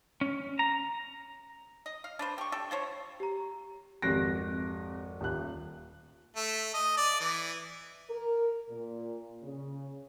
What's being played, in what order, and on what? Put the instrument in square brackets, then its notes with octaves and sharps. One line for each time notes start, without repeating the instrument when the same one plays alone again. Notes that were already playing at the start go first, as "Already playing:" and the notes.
[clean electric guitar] C#4
A#5
[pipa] D#5
F5
D4 B4 C5
G4 C#6
D4 G4 A4
F3 C5 C#5
[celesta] G4 A#5
[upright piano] G#1 F2 A#6 [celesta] G4 F#6 D7
[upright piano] D#1 F#6
[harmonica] A3
D#5
D5
E3
[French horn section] A#4
A#2
C#3